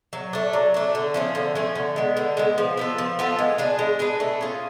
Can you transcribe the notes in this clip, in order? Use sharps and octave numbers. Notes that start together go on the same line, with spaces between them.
F#3
A3 D4
F#3
A3 D4
D3
F3 A3 C#4
D3
F3 A3 C#4
D3
G#3 B3
D3
G#3 B3
F3
B3 F4 A4
F3
B3 F4 A4
G#3
D4 G#4 B4
G#3
D4 G#4 B4
A3
C#4 F4 G#4